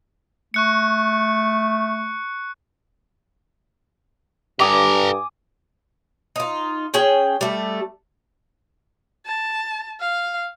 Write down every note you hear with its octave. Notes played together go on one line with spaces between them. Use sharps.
A3 C#6 F#6 C#7
G2 A4 G#5 A#5 D6 D#6
D#4 F4
C#4 G#4 G5
G3 A3
A5
F5